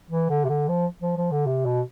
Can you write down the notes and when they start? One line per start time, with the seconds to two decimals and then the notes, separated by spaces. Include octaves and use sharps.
0.10 E3
0.29 D3
0.45 C3
0.49 D3
0.68 F3
1.02 F3
1.17 F3
1.32 D3
1.46 C3
1.65 B2